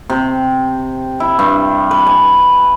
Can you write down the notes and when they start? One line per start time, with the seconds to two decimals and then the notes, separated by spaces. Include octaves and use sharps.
0.10 C3
1.20 E4
1.39 G2
1.91 B4
2.06 G#5